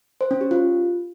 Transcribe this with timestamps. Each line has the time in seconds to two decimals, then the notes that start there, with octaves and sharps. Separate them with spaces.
0.21 C5
0.31 C#4
0.41 G4
0.51 F4